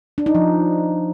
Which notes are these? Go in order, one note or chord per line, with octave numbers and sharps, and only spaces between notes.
D4
D#4
F3